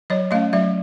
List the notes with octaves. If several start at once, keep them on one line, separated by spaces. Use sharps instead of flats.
F#3 C#5 D#5
A3 C#4 D#5 F5
F#3 D5 E5